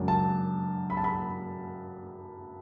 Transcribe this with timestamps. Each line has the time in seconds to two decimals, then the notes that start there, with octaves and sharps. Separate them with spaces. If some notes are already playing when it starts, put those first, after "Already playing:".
Already playing: F#2 C#3 G#3 D4
0.08 A5
0.90 B5
0.97 A5
1.04 B5